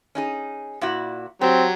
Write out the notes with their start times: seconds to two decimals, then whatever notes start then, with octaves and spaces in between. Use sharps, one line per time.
0.15 C#4 D#4 G#4
0.81 A#2 E4 F#4
1.41 F#3 C4 G4